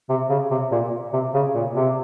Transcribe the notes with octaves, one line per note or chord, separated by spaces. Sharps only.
C3
C#3
C3
A#2
C3
C#3
A#2
C3